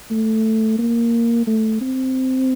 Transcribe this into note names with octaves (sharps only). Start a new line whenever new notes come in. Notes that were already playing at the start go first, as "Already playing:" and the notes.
A3
A#3
A3
C4